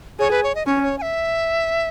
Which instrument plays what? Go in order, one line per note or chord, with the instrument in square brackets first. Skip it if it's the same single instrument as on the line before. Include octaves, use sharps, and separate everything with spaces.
[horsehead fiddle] G#4 [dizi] C#5
[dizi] B4
C#5
D#5
[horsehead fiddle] C#4 [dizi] C#5
[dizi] C#5
G#5
E5